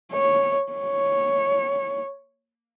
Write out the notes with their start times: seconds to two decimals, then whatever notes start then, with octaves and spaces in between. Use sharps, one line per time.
0.12 C#5
0.72 C#5